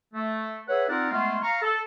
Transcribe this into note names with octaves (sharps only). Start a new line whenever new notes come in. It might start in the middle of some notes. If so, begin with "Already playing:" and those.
A3
G#4 B4 C#5 E5 F#5
C4 D#4 F4 A#4 D5 F#5
G#3 A3 B3 F4
F5 A#5 C#6
A4